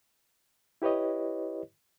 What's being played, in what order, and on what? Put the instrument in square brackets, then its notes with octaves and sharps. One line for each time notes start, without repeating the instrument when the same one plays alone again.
[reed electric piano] E4 G4 B4 C#5 D#5